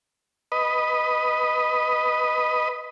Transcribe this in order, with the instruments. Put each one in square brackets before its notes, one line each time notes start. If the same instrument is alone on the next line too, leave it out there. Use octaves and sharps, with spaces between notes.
[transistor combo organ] B4 D#5